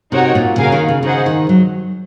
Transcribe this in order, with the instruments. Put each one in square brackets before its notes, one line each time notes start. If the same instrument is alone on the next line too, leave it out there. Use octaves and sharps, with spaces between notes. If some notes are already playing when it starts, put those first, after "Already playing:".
[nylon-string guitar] C3 [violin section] D#4 F#4 A#4 C#5 F#5
[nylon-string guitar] A#2
[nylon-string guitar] C#3 [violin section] C#4 F#4 A#4 F5 G#5
[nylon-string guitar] D#3
C#3
[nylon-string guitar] C#3 [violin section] D#4 G#4 C5 F#5
[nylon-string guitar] D#3
F#3